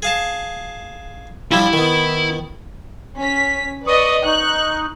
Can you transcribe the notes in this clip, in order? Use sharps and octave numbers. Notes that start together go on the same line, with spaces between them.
G#4 F5 A5
F3 G3 D4 E4 B5
D#3 B3
C#4 B6
B4 D5 D#5 C#6 D#6
D#4 C#6 F#6